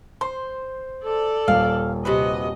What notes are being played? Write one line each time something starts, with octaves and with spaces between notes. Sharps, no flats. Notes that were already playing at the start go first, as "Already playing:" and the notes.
C5 C6
A4 D5
D#1 F5
C3 F#4 B4 D#5